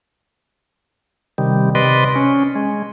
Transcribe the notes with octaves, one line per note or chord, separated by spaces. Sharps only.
C3 D#3 G3
C3 B4 D5 D#5 C6
C#4
G#3